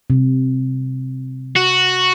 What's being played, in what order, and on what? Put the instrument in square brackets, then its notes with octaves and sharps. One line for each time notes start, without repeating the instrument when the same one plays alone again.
[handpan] C3
[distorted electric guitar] F#4